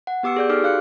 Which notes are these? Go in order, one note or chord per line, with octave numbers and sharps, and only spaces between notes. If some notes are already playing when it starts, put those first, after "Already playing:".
F#5
B3 G4 D6 E6 C#7
G#4 D5 G6
D#4 G4 A4 D6 F6
D#4 F#4 F5 F#6 C#7